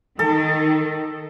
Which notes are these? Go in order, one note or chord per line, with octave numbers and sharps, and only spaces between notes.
D#3 A4